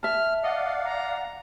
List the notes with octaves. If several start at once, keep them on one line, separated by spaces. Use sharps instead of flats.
E5 A5 F6
D5 D#5 F5 F#5
A#5